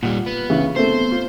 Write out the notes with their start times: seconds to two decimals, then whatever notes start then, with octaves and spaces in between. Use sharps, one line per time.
0.03 A#2 G3 F4 F#5
0.26 B3
0.50 C#3 E3
0.76 A3 B3 C4 C5
1.11 F4